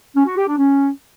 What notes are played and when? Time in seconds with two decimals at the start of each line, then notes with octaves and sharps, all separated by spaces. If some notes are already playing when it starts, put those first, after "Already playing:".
0.15 C#4
0.26 F#4
0.37 G4
0.48 D4
0.58 C#4